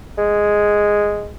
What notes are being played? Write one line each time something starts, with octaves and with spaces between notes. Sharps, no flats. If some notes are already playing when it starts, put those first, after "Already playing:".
G#3